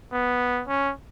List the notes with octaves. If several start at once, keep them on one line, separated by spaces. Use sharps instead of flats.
B3
C#4